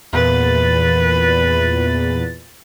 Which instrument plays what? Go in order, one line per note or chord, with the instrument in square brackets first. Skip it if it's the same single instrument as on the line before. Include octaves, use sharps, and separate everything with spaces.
[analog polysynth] E2 A#2 A6 [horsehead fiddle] B4